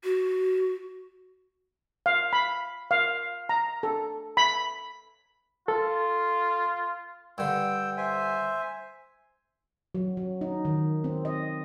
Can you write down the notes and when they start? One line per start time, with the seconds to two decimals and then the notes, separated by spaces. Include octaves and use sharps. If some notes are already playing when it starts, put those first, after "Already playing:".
0.04 F#4
2.06 F5
2.33 B5
2.91 F5
3.49 A#5
3.83 A4
4.37 B5
5.68 F4 A4
7.38 G2 D3 G5 E6
7.97 C5 E5 G#5
9.95 F#3
10.17 F#3
10.41 D#4
10.65 D#3
11.04 C4
11.25 D#5